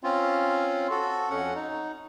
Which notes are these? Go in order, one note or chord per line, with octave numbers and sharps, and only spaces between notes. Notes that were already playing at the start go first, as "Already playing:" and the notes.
C4 C#4 F4
F#4 A4
F2 C#4 F#5
D#4